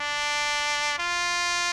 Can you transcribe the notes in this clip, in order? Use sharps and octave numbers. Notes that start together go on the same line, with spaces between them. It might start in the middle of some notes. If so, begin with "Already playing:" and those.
Already playing: D4
F4